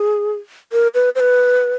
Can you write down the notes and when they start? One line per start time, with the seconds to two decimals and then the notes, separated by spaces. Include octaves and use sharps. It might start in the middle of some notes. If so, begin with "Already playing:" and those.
Already playing: G#4
0.72 A#4
0.94 B4
1.15 C5
1.20 B4